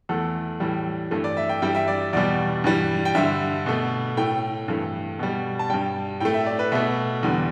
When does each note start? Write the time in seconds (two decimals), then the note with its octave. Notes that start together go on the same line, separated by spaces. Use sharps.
0.09 E2 E3 A3 A4
0.60 A2 E3 G3
1.11 G2 E3 A3
1.24 D5
1.37 E5
1.49 G5
1.62 G2 E3 G3 G5
1.75 E5
1.88 D5
2.13 E2 B2 G3 D5
2.64 G2 E3 G3
3.05 G5
3.15 G2 D3 G3 E5
3.66 B2 A3
4.17 A2 A3 G5
4.68 G2 E3 A3
5.19 B2 G3
5.59 A5
5.70 G2 G3 G5
6.20 A2 A3 G5
6.34 E5
6.46 D5
6.59 B4
6.72 B2 A3 E5
7.23 E2 D3 G3